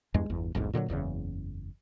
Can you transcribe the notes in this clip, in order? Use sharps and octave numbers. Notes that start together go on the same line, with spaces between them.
E2 G2 G#3
G1 E2
E1 B1 G#2
A#2 D3 F3 F#3
F#1 E2 G#2 C#3